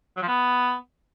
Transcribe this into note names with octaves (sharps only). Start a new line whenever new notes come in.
F#3
F3
B3